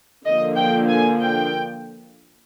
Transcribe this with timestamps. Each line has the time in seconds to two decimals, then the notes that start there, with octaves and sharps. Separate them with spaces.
0.24 D3 F3 A#3 D#5
0.56 G5
0.88 G#5
1.21 G5